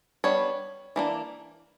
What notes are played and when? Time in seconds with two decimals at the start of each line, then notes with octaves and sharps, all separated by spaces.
0.24 G3 B3 D4 C#5
0.96 E3 A#3 D4